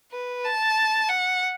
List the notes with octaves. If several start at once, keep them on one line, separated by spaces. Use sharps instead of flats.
B4
A5
F#5